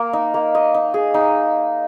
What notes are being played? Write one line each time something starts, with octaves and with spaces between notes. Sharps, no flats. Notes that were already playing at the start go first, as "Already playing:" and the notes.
Already playing: A#3 A#4
D#4
A#3
D#5
D#4
G#4
D#4